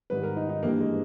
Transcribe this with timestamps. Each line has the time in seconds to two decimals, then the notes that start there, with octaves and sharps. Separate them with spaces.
0.10 G#2 D#3 G3 B4
0.23 A#4
0.36 D#4
0.49 D#4
0.62 G2 E3 G3 A#3
0.80 G#3